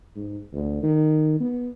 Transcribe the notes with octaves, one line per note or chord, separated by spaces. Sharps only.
G#2
D2
D#3
B3